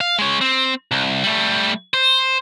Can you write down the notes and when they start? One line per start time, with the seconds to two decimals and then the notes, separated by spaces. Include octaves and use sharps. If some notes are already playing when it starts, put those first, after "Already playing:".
0.01 F5
0.19 G#3 C#5
0.41 C4
0.91 C2
1.23 G3 A3
1.94 C5